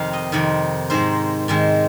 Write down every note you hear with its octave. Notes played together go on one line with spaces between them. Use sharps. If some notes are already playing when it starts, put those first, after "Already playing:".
Already playing: F2 C3 D#3 F5
D#5
F2 C3 D#3
G#2 D#3 G#3 C5
G#2 D#3 G#3